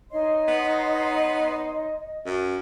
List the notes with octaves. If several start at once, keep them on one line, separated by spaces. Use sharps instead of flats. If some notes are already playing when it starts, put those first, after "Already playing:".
D#4 C#5 D#5 C6
B3
F#2